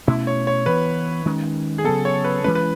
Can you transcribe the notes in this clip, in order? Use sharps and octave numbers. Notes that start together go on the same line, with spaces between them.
B2 A3 C#4 E4
C#5
C#5
E3 B3 B4
D#3 G#3 C#4
G#4
C#3 F#3 B3 A4
C#5
B4
E3 G#3 C#4 B4
B4